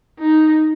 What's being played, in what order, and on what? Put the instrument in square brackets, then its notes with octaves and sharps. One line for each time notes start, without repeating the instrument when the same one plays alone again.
[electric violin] D#4